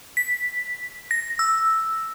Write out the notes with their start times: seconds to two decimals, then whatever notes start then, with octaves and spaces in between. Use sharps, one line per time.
0.17 B6
1.11 A#6
1.39 E6